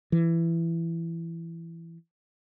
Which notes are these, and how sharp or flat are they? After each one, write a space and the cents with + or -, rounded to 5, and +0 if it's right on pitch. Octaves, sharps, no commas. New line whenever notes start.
E3 +15